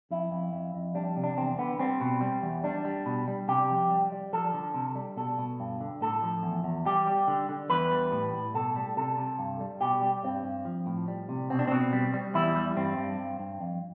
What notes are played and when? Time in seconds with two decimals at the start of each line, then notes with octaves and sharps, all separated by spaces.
0.11 F2 E4
0.32 F2
0.53 F2
0.74 F2
0.95 G3 D4
1.16 C3
1.24 D4
1.37 E2 C4
1.58 D3 B3
1.79 G3 C4
2.01 B2
2.21 G3
2.42 E2
2.64 G3 D4
2.85 G3
3.06 B2
3.28 G3
3.48 C3 G4
3.70 F2
3.90 G3
4.12 G3
4.32 F3 A4
4.54 D3
4.74 C3
4.95 G3
5.17 B2 A4
5.38 B2
5.60 G2
5.80 D3
6.01 A2 A4
6.23 F3
6.43 E2
6.64 E2
6.86 G3 G4
7.07 G3
7.28 D3
7.49 D3
7.70 E2 B4
7.91 G3
8.12 A2
8.34 A2
8.54 B2 A4
8.76 G3
8.97 C3 A4
9.18 C3
9.39 G2
9.60 G3
9.81 B2 G4
10.02 G3
10.24 G2 C4
10.44 G2
10.65 F3
10.86 A2
11.08 G3
11.29 C3
11.50 B2 C4
11.59 D4
11.67 B2 C4
11.93 G3
12.14 G3
12.35 E2 E4
12.56 G3
12.76 G2 C4
12.98 G2
13.19 G2
13.39 G2
13.61 F2